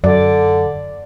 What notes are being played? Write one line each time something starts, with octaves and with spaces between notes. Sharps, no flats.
F#2 D3 D5